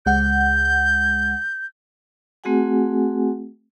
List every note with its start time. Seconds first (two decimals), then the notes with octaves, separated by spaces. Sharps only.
0.06 C#2 G#3 F#5 G6
2.44 A3 C4 F#4 G#4 F#5 G#5